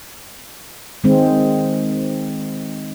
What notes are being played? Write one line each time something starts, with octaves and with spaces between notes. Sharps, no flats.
D#3 G#3 C4